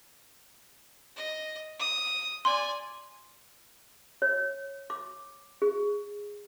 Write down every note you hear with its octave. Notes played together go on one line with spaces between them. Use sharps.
D#5
D#6
D5 G#5 C6
C#5
D6
G#4